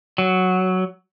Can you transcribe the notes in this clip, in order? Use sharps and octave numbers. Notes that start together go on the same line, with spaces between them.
F#3